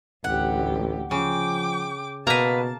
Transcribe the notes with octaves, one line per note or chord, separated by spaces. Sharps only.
A1 D2 G4 F#5
C#3 F3 G5 D6
B2 A#3 B4 E5 F5 A5 A#5